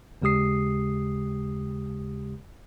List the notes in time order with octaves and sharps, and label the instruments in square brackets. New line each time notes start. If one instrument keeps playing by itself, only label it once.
[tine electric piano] D#2 C#3 G#3 G4 D#6 C7